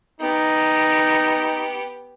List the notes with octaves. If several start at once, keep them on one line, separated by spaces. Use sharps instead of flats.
B3 D#4 G4